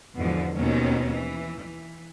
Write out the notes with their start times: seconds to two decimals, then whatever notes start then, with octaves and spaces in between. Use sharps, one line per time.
0.18 E2 G#2 B2 D3 E3 F3
0.54 D#2 B2 D#3 C4 C#4
1.11 E3
1.58 E3